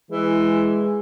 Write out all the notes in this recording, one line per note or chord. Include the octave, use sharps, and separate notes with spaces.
E3 G#3